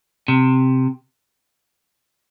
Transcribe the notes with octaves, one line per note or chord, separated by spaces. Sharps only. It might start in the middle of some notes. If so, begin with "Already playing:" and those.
C3